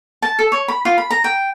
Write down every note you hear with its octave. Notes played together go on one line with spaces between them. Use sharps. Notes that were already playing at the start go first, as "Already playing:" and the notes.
A5
A4
C#5
B5
F4
B5
A#5
G5